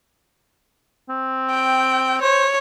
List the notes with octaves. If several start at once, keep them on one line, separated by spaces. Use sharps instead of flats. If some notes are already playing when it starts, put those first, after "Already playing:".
C4
G5
C5 C#5